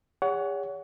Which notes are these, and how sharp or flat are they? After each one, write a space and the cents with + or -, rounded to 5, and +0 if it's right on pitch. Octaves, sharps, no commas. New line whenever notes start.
G#4 -45 C#5 +30 F#5 +5